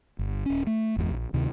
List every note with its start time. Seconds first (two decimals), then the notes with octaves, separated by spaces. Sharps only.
0.19 G1
0.46 D#1 C#4
0.67 A3
0.96 G1 E2 G#3
1.10 A#1
1.33 D2 C3 D#3